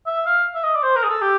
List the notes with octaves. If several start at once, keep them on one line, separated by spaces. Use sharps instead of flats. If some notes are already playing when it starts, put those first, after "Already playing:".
E5
F5
E5
D#5
D5
C5
A#4
G#4
A4
G4